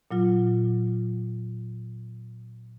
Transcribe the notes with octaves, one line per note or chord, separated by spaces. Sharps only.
A#2 F#3 F4